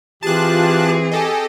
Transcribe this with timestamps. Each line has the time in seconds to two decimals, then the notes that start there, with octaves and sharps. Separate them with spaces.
0.23 E3 C4 F4 G4 G#4 A5 F#6
1.12 G4 A4 D#5 G#5